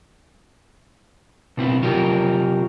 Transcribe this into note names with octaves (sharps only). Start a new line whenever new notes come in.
B2 C4 E4
C3 F#3 F4 G4 A#4